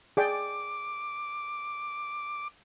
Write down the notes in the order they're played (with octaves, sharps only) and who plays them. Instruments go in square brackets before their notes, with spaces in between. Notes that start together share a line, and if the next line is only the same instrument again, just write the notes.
[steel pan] G#4 D5 G5 [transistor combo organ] D6